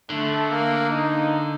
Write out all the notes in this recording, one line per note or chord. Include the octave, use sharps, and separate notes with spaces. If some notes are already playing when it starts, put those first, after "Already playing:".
D3 A3
A#3
D#4